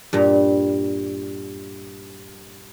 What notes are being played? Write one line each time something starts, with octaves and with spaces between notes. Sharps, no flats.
G2 A#2 G3 A#5